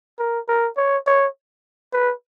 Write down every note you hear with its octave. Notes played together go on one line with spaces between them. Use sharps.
A#4
A#4
C#5
C#5
B4